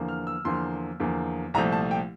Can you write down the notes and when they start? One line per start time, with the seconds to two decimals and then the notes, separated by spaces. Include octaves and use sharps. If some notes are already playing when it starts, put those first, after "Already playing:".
Already playing: E2 D3 F3 A#3
0.08 F6
0.27 E6
0.45 E2 D3 F3 A#3 C6
1.00 E2 D3 F3 A#3
1.54 C2 A#2 F3 A3 A#5
1.72 A5
1.91 G5